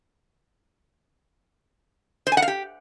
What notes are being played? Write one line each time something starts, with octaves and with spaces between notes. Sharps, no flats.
C5
G#5
F#5
F5
G4